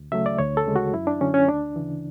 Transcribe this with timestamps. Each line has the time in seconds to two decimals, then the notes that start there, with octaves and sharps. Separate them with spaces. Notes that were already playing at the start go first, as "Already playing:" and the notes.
Already playing: D2
0.12 C#3 F#3 A3 E5
0.26 D5
0.39 D2 C#5
0.57 A4
0.66 C#3 G#3
0.76 F#4
0.93 F#2 E4
1.07 D4
1.21 D3 F#3 C#4
1.34 C#4
1.48 D2 D4
1.76 C#3 E3